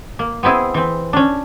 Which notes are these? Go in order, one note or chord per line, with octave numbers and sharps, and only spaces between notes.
A#3
B3 C4 E4 G#4
E3 C4
C#4 D4